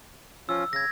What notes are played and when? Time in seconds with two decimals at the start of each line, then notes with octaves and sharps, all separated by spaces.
0.49 F3 C#4 F4 E6
0.73 C#3 G#6 A#6